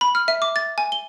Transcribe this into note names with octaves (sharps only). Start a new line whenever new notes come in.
B5
F6
E5
D6
A6
G#5
G7